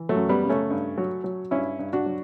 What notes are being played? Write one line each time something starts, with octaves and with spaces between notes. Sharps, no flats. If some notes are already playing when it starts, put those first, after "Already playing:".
Already playing: E3
F#3 A3
F#2
G3 B3
C#3
A3 C#4
G2
F#3
F#3
G2 C#4 E4
G2
D4 F#4
F#3